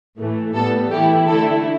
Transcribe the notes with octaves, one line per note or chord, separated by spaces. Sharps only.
A2 E3 A3
A2 G3 B3 A4
E3 A3 E4 G4
D3 A3 E4 A4